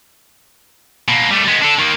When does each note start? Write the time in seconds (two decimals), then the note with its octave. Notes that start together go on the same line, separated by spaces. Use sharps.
1.08 B2 A#3
1.30 G3 A3
1.48 G#3 B3
1.62 D4 A4
1.79 D#3 A#3